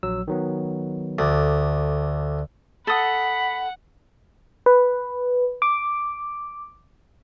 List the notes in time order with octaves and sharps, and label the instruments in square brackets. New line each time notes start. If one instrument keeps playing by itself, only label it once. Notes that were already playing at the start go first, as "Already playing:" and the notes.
[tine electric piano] A#1 F#3 E6
D#3 F#3 B3
[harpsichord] D2 [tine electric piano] A4 D5
[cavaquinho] A4 D#6 [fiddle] F#5 [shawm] B5
[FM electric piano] B4
D6